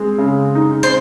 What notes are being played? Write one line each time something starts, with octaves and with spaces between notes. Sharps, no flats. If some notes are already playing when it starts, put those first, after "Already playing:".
Already playing: G#3 C4
C#3
D#4
C5